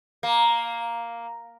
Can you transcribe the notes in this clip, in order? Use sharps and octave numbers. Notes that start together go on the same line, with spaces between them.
A#3